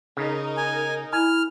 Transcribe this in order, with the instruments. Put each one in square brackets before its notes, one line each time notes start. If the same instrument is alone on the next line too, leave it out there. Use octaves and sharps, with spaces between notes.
[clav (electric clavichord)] C#3 [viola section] D#4 A#4
[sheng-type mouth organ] G#5
[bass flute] E4 [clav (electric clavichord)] G#5 [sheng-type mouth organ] F6